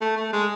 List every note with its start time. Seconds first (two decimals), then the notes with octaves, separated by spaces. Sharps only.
0.01 A3
0.17 A3
0.33 G#3